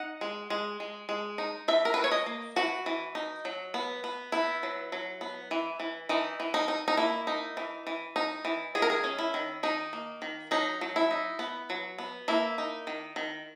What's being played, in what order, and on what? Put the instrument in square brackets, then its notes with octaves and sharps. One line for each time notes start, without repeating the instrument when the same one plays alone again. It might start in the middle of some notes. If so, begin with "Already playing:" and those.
Already playing: [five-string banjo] D#4 F#5
G#3
G#3
G#3
G#3
D#4
E3 E5
A#4
E3 B4
C#5
D#5
A#3
E3 F#4
E3
D#4
F#3
B3
B3
B3 E4
F#3
F#3
B3
E3
E3
E3 D#4
E3
D#4
D#4
D#4
A#3 E4
D#4
E3
E3
D#4
E3
D#3 G#4
A#4
G#4
C#4
E4
D#3
D#3 D#4
A#3
D#3
F#3 D#4
F#3
E4
D#4
B3
F#3
B3
A#3 E4
D#4
D#3
D#3